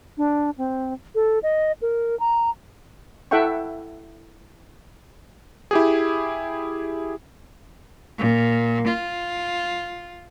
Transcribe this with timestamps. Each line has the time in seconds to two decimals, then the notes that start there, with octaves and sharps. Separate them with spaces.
0.17 D4
0.58 C4
1.15 A4
1.43 D#5
1.82 A#4
2.20 A#5
3.31 E4 A4 E5 F#5 G5 C#6
5.71 E4 G4 G#4
8.19 A#2
8.88 F4